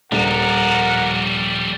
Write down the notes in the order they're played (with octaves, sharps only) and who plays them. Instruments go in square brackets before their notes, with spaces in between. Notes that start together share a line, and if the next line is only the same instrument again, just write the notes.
[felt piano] D#1 [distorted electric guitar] F3 G3 [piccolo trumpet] A#4 [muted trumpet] F#5